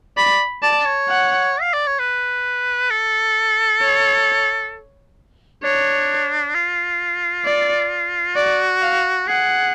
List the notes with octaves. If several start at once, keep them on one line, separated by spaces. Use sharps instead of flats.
D5 B5
D5 A5
C#5
F#5
F5
D5
C#5
B4
A4
C#5
D4 C#5
F4
D5
F#4 D5
F5
G#4 F#5